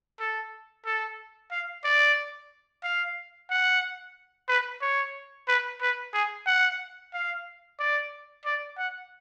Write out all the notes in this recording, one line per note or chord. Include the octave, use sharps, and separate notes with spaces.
A4
A4
F5
D5
F5
F#5
B4
C#5
B4
B4
G#4
F#5
F5
D5
D5
F#5